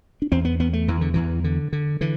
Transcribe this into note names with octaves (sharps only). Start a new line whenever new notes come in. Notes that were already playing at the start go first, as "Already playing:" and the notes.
D4
E2 C4
B3
E2 B3
A3
E2 E3
D3
E2 E3
D3
D3
D3 E3